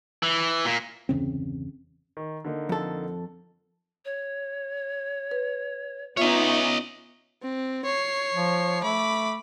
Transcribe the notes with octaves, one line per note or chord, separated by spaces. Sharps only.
E3
A#2
G1 E2 C#3 C4
D#3
D3 A#3 D#4
F2 A4
C#5
B4
B3 C#4 D#4 F4 C#5 D#5 E5
C4
C#5 C7
F3
A3 B5 D6